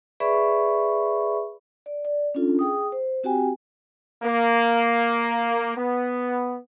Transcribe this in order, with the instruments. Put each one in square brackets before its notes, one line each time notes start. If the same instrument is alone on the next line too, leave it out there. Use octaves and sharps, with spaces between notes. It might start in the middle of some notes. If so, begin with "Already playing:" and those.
[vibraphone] G#4 B4 D5 E5 B5 C#6
D5
D5
C#4 D4 F4 A4
G#4 G5 D#6
C5
C4 F#4 G4 G5 G#5
[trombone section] A#3
B3